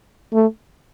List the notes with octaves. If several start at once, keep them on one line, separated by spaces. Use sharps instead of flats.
A3